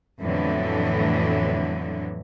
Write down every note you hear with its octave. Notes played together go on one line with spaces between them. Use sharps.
F2 A2 D3 E3 F#3 B3